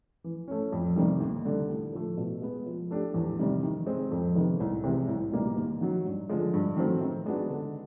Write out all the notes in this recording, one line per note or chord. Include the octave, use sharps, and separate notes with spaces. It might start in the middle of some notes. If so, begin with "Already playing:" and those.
E3
A3 C#4
F2
C3 D#3 G3
D#2
D3 G3
A2
F3 A3
B2
G#3 B3
F3
A3 D4 G4
E2
C3 D#3 G3
D#3
G#3 C4
F2
C3 D#3 G#3 B3
C2
C3 E3 G#3
C2
B2 G3 A#3 D#4
D#2
D#3 F#3
G2
D3 F3 G#3
G2
D#3 F#3 A3 C4
D#3
G#3 B3 D4 F#4
D3